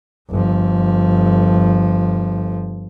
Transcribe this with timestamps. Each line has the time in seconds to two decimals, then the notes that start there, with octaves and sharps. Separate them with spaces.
0.30 G1 F3